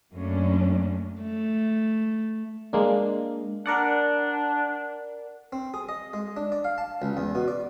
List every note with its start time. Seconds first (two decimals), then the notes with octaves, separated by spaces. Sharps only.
0.12 F#2 A3 A#3 C#4 D4
1.22 A3
2.73 G#3 A#3 D4
3.66 D4 A#4 D5 F#5
5.52 C4
5.74 G#4
5.89 D#5
6.13 G#3
6.37 D4
6.52 D5
6.64 F5
6.78 A5
7.02 C#2
7.17 E2
7.35 B2
7.48 D5